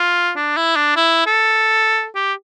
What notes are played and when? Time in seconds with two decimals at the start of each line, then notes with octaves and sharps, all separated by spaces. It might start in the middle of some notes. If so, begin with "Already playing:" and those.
Already playing: F4
0.36 D4
0.57 E4
0.76 D4
0.96 E4
1.26 A4
2.15 G4